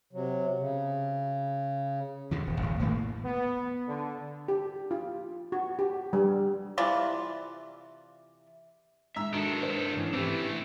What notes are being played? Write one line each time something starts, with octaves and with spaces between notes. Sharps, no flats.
C3 F#3
C#3
E2 B2 D3
D#1
G#1 E2
D#1 A2 D#3 A#3
B3
D3
G4
F4
F#4
G4
G3
C3 E3 F4 D5
G#2 E5 A#5 E6
G#2 D#3 D4 F#4 A4
B4 C5
G#2 E3 C#4
E3 A3 C4 G4